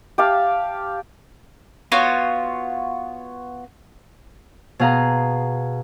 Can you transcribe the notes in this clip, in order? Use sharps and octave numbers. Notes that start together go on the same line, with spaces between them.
G4 F5 A5
B3 F4 F#4 C#5
B2 G#4 F5 A#5